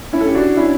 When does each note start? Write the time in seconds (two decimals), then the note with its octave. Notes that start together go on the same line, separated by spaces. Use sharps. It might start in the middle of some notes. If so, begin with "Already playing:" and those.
0.13 C#4 E4
0.21 A4
0.27 G4
0.35 D4 F#4
0.57 C#4 E4